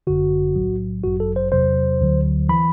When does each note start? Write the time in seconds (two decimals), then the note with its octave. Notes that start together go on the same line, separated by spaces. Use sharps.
0.07 G1 F#2 D3 F#4
0.55 B1 A2 F#3
1.04 G1 F#2 F#3 F#4
1.20 A4
1.36 C5
1.52 E2 C3 F#3 C5
2.01 D2 D3 F#3
2.49 E3 B5